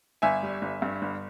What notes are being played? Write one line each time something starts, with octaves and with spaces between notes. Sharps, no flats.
G1 E5 G#5
G3
G1
G2
G1